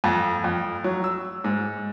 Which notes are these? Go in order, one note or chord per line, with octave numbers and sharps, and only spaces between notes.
F2
F2
F#3
E6
G#2